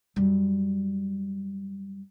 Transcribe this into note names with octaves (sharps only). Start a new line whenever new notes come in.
F#2 G3